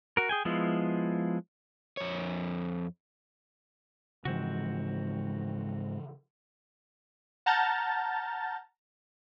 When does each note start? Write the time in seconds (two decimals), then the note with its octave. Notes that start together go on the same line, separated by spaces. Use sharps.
0.17 F#4 A#4
0.29 G#4 G5 G#5
0.45 F3 G#3 B3 E4 F4
1.97 F2 C#5
4.25 G#2 C#3 E3 F3 C4 F#4
7.46 F#5 A5 A#5 F6 G6 A6